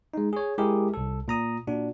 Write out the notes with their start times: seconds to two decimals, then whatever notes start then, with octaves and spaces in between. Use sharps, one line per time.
0.14 G#3 D#4
0.33 G#4 C#5
0.58 G#3 E4 G4 G#4 A#4
0.94 C2 A4
1.28 A#2 A#5 D#6
1.67 A#2 D4 F#4